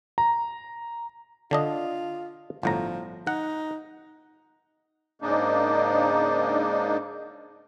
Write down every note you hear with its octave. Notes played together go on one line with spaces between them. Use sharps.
A#5
D3 D4 F4 D#5
G1 A2 F3 A#5
D#4 F#5
G#2 C#3 A#3 D4 D#4